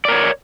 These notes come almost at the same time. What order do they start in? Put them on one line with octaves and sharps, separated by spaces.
D5 A#4 C#5